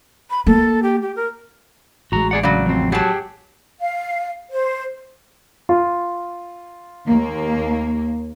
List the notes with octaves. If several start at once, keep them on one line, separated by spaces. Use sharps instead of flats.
B5
A#3 A4
G4
G4
A#4
A1 G#3 F#4 A#5
G#4 D5 F#5
C#3 F#3 D5
F2 C4
F#3 G4 G#4 F#5 A5
F5
C5
F4
D#2 A#3